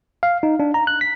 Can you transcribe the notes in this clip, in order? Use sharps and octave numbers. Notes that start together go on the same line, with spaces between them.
F5
D#4
D4
A#5
F#6
B6